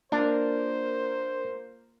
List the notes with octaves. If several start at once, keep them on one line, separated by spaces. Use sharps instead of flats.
A#3 D4 F4 A#4 C5